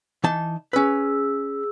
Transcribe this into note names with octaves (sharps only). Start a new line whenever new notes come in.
E3 D#4 A5
C#4 G#4 B4 E6